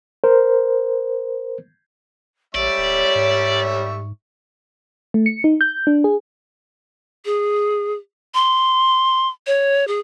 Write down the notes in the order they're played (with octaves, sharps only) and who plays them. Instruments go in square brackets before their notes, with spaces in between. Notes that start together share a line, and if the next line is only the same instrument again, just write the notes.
[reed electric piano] A#4 C5
[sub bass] A1 [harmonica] G3 E5 C#6 [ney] C#5 [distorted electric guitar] D5
[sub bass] D1
G#2
[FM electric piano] A3
C#7
D#4
G6
D4
G#4
[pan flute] G#4
C6
C#5
G#4